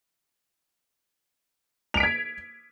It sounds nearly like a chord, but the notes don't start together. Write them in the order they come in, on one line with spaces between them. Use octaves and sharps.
F7 D7 B6 G#6